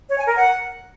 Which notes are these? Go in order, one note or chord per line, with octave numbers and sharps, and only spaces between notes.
C#5
G#5
A#4
F#5